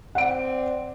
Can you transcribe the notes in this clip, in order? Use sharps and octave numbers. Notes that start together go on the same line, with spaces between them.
C4 D5 F#5 D7